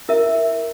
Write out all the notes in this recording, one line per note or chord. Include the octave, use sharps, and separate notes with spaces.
E4 A#4 E5